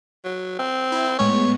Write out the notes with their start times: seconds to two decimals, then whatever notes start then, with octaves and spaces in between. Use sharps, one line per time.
0.25 F#3
0.59 C4
0.92 E4
1.19 A2 G#3 B3 C#5